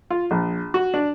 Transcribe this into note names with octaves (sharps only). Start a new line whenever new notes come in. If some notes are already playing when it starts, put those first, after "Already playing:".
F4
A#1
F#4
D4